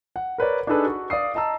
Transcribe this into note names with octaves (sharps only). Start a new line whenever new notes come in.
F#5
A#4 B4 C#5 D5
D4 D#4 G#4 A4 B4
F#4
D5 F5 D#6 C7
D#5 A5 A#5 E6